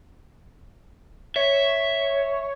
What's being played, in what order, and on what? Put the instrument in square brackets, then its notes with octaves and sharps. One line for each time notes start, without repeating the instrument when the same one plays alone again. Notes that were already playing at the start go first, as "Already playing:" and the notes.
[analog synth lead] C#5 [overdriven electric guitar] E5